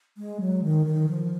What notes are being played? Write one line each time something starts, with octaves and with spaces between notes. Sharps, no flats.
G#3
F#3
D#3
D#3
F3